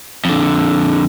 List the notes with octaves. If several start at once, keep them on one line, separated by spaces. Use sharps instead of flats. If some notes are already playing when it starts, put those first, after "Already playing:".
F2 D3